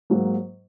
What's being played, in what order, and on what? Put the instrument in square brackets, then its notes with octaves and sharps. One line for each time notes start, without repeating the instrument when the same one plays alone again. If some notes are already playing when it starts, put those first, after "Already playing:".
[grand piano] G#2 F#3 A#3